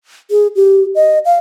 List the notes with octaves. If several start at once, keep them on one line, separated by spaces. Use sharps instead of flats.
G#4
G4
D#5
F5